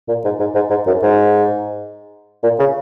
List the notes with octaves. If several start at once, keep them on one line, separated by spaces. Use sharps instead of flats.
A#2
G#2
G#2
G#2
G#2
F#2
G#2
A#2
C#3